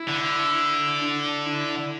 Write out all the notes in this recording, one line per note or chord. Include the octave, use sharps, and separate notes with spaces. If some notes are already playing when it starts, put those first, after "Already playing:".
Already playing: E4
D3
D4
E4